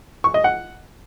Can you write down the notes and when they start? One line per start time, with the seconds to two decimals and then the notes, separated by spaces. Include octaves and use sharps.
0.24 C#6
0.34 D#5
0.44 F#5